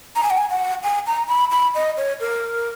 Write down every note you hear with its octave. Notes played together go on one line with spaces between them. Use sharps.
A#5
G#5
F#5
G#5
F#5
G#5
A#5
B5
B5
D#5
C#5
A#4